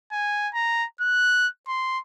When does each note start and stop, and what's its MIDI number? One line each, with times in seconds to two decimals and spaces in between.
0.12 0.48 80
0.54 0.85 82
1.01 1.48 90
1.68 1.99 84